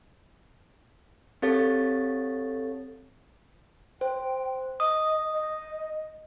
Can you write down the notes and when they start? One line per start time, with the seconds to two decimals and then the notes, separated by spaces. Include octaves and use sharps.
1.42 C4 G4 A4 C#5 F5 A6
4.01 C5 G5
4.80 D#5 D#6
5.33 D#5